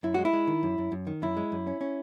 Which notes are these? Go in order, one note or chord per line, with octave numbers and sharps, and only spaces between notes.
F#2 E4
G#3 F#4
E4
G#3
D#3
F#2
F#2
F#2
D#3
F#2 E4
G#3
F#2
C#4
C#4